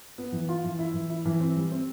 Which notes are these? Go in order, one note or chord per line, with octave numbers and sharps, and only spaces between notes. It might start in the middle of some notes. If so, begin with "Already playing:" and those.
B3
E3
F4
E3
E4
E3
E4
E3
C4
G3
C4